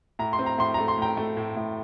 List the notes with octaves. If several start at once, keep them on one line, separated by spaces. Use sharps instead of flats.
A2 A#5
C6
C4
A#5
A2 C6
A3 A#5
C6
A2 G5 A#5
A3
A2
A2